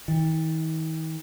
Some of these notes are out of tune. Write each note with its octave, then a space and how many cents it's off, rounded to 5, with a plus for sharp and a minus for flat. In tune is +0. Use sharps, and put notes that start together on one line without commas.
D#3 +45